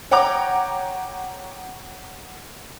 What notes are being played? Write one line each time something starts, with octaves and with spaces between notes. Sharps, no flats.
C#5 F#5 G5 A#5 D6